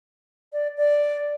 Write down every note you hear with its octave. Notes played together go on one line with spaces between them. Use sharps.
D5
D5